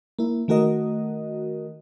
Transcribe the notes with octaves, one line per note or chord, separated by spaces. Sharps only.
A#3 E4
D#3 A3 F#4 A#4 D#5